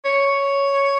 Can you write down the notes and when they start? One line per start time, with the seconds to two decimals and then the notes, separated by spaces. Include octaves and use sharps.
0.05 C#5